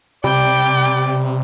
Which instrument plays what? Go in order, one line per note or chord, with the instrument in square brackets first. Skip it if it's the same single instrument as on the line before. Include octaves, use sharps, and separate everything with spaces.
[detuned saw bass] C3 [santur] G3 [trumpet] D5 [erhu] G5